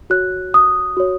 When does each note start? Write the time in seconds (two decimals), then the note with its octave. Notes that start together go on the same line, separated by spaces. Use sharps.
0.10 F#4 C#5 F#6
0.54 D#6
0.97 F#4 C#5